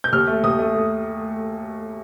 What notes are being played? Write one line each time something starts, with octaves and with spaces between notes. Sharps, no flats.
G6
D#2 F6
A3
D#2 D#6
A3
A3